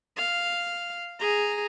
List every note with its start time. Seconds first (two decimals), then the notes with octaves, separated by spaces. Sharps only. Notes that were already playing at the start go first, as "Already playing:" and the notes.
0.17 F5
1.20 G#4 A#5